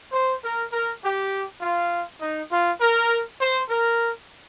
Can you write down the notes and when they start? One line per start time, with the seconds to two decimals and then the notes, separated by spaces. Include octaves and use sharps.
0.13 C5
0.44 A#4
0.72 A#4
1.02 G4
1.62 F4
2.22 D#4
2.51 F4
2.81 A#4
3.41 C5
3.70 A#4